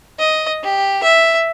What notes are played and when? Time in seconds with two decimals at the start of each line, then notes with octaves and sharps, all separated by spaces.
0.19 D#5
0.64 G4
1.03 E5